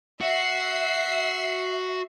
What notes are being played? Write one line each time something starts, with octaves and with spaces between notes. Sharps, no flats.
F#4 E5 C7